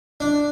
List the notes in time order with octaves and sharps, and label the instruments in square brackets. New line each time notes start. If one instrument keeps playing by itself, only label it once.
[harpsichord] D4